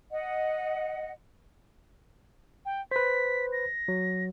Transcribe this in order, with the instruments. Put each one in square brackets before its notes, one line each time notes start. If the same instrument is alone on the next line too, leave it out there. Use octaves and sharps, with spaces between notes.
[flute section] D#5 F#5
[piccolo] G5
[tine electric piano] B4 C5 [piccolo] B6
[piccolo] A#6
[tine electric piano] F#3